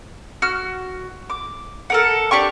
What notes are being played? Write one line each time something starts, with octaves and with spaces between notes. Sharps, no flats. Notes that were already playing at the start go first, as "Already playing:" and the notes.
F#4 F6
D6
A4 A#4 F#5
D4 G4 G5 C#6